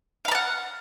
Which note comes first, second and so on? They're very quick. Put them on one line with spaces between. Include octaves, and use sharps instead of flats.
F5 B5 A5 F#5